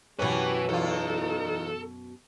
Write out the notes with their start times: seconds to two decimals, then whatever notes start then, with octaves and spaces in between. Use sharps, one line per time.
0.19 F#2 B2 E3 C#4 G4 B4 G#5
0.69 E2 D#4 F4 A4